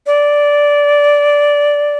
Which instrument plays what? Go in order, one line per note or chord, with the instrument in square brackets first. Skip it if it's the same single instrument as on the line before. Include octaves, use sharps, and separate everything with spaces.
[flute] D5